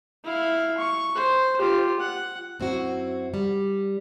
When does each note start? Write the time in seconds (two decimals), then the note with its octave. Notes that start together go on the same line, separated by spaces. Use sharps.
0.24 E4 F5
0.78 C#6
1.15 C5
1.58 F4 G4
2.00 F#5
2.60 F#2 C4 E4 F#4
3.34 G3